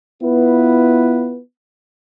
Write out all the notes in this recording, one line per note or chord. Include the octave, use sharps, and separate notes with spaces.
B3 E4 F4 B4